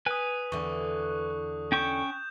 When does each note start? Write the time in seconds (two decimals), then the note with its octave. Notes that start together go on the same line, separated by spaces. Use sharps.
0.06 B4 G#5 D#6 F#6
0.52 E2 D3 C#6
1.72 C#4 G5 C#6 G6 E7